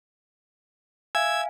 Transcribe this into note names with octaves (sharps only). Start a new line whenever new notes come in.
E5 F5 G#5 E6 G#6